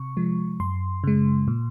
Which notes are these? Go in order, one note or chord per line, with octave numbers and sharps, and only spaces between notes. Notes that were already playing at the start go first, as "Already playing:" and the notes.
Already playing: C3 C#6
F3 G#3
F#2 C6
C#3 G#3
A#2